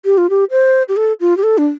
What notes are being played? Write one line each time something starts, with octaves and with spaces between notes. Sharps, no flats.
G4
F4
G4
C5
G4
A4
F4
G4
A4
D4